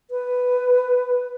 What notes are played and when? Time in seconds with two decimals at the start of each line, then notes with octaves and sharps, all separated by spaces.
0.11 B4